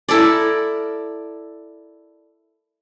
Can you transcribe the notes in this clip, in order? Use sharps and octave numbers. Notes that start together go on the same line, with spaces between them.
E4 A4 A#4 D5